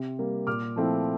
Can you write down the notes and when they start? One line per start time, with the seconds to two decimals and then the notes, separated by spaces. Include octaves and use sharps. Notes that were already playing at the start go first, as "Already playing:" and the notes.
Already playing: C3
0.19 G3 A#3
0.47 A#2 D6 F6
0.76 F3 A3 C4 E4